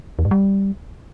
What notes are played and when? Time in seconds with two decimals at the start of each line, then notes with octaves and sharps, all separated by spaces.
0.19 E2
0.25 G#2
0.31 G3